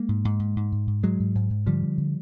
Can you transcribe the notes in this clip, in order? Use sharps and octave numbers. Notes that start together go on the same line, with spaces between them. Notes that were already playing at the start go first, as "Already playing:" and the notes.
Already playing: G#3 A#3
G#2
G#2
G#2
G#2
G#2
G#2
G#2 F#3 G#3
G#2
G#2
G#2
D3 F3 G3
D3
D3